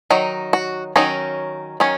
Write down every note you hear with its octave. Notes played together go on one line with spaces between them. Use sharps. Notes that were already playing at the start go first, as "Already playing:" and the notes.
D#3 F#3 D#4
F#4
D#3 F#3 C#4 D#4
D#3 F#3 C#4